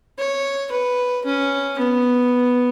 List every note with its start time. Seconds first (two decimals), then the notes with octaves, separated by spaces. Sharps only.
0.18 C#5
0.72 B4
1.26 C#4
1.79 B3